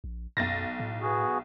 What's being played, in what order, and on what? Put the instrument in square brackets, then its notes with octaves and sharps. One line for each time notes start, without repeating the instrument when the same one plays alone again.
[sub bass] A#1
[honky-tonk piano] B1 A6 A#6 [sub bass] F#2
[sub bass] A2
[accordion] B3 F#4 G#4